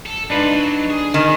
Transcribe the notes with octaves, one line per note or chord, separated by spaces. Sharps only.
A4
G#2 D4 D#4 F4 B4
F#3
G#4
D#3 D5 G#5